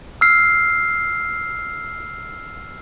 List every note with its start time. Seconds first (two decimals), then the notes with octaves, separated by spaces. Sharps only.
0.21 E6 F6 C7